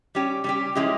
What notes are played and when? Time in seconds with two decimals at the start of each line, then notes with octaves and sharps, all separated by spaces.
0.15 G3 C#4 G4
0.44 G3 C#4 G4
0.75 F3 G#3 C#4 E4 G4